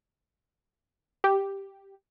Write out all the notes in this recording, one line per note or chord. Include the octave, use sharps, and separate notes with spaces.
G4